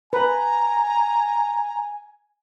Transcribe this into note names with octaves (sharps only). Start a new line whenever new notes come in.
B4 G#5 A#5